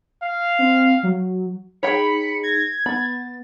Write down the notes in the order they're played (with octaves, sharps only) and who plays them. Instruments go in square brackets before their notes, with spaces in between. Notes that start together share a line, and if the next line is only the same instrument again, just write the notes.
[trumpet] F5
[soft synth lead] C4
F#3
[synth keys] D#4 G#4 [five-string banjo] C#5 G5 [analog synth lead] B5 [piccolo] C#7
[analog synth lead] G#6 [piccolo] A#6
[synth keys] B3 [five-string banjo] B5 [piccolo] A6